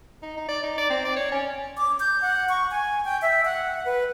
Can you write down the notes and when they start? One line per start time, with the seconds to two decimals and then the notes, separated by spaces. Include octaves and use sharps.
0.23 D#4
0.37 D#4
0.49 D5
0.63 D#4
0.78 D5
0.90 C4
1.05 D5
1.16 C#5
1.32 C#4
1.77 D6
2.00 G6
2.22 F#5
2.49 C#6
2.71 G#5
3.05 G5
3.22 E5
3.45 F#5
3.85 B4